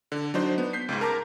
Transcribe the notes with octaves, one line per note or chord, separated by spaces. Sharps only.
D3
F#3 D4 D#4 C5
B3
G6 B6 C7
C#2 G#2
A#4 A5 A#5 D6